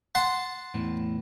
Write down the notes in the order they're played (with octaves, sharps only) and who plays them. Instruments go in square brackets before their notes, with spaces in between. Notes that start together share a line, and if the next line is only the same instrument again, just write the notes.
[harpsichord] F#5 A5 C6
[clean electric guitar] E2 A2 E3